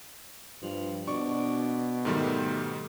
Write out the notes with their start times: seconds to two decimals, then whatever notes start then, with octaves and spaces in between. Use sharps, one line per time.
0.62 G2 F3
1.08 B2 D4 C#6
2.05 G#2 D#3 G3 A3